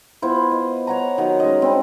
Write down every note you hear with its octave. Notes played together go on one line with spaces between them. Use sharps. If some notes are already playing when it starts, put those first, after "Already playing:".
B3 E4 F4 C5
D#5
C#5 F#5 A#5
D#3 F#3 F#4
G#3 C#4 D#5
C4 D4 B5